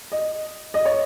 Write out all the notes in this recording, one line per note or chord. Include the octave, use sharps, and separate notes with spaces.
D#5
D#5
C#5